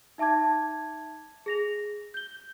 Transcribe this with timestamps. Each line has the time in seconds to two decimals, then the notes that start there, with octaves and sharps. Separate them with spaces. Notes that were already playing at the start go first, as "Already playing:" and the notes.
0.18 D#4 E5 A5 D6 G#6
1.46 G#4 A#6 F7
2.14 G6 G7